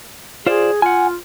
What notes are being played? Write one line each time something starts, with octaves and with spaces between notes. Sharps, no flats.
F4 G#4 C5 D5
F4 F#5 G#5